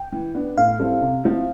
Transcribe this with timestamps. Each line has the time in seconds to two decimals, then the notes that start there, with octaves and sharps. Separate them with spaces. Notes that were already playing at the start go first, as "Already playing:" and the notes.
Already playing: G5
0.12 E3
0.35 B3 D4
0.57 A2 F5
0.79 G3 C4 E4 A4
1.01 C3
1.24 F3 C4 E4